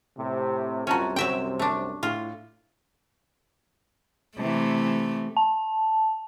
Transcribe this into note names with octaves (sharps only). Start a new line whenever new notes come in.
A2 C3
C2 F#2 C3 C#4 F4 F#4 A5 A#5
F#3 C4 E5 G5
A3 D4
A2 F4
C3 E3 A3
A5